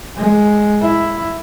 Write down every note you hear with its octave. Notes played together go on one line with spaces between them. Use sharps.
G#3
E4